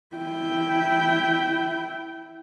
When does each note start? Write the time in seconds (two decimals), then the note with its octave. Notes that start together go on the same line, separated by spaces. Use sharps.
0.16 E4 G5